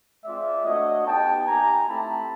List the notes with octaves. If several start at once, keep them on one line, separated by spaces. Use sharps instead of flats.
G#3 C4 F4 D5 E5
A3 D4 F#4 C#5 D#5
B3 D#4 G4 G5 A5
A#3 D#4 G4 G#5 A#5
A3 C4 E4 G4 A5 B5